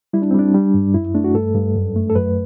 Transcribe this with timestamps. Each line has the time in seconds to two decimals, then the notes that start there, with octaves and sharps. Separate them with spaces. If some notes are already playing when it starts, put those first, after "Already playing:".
0.13 G3 E4
0.22 D4
0.31 C4
0.34 G3 D4
0.54 G3
0.74 G2
0.94 F#2 E4
1.15 A3 D4
1.24 F#4
1.35 G2 A4
1.55 G2
1.75 F#2
1.96 A3
2.10 A4
2.15 F#2 B4